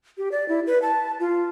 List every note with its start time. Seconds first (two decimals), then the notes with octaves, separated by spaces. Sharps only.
0.18 G4
0.32 D5
0.49 E4
0.67 B4
0.82 A5
1.20 F4